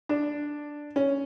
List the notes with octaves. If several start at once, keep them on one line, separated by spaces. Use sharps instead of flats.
D4
C#4